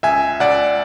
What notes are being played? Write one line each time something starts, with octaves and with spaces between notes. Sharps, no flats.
C#2 E5 G#5
C#2 D5 F#5